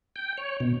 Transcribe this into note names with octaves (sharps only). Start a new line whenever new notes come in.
G5
C#5
B2